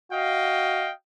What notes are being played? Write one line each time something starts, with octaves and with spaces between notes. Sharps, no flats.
F#4 D#5 F5 G5